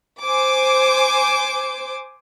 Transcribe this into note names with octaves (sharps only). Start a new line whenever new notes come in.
C5 G#5 D6